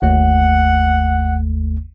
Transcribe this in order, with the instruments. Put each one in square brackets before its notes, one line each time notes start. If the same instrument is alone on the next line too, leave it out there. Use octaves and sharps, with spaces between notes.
[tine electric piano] G1 D#2 A3 [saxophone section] F#5